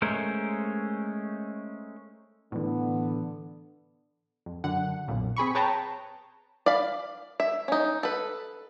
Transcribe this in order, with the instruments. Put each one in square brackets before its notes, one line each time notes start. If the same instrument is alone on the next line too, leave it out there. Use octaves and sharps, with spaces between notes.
[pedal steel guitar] G#3 A3 C#4 A#4 C5
[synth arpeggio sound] A2 E3 [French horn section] D3 B3
[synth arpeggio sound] F2
F#2 D3 F#5
B1 F#2 A#2
C4 G#4 B5 C#6
G#4 B4 C#5 G5 A5 A#5
[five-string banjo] D5 F5 B5
E5
C#4 D#4
A4 B4